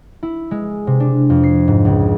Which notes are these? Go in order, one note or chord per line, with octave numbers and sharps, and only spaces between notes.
E4
G#3
C3
D4
F2
C7
G#2
C#2